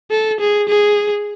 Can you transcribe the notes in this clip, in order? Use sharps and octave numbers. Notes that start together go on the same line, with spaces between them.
A4
G#4
G#4